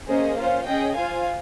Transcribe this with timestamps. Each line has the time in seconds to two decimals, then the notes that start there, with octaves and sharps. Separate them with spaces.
0.08 A#3 C#4 G#4 C5 D#5
0.37 C#4 F4 C5 F5
0.66 C#4 G#4 D#5 G5
0.95 F4 C5 F5 G#5